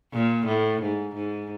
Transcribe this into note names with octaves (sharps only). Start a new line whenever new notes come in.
A#2
A2
G#2
G#2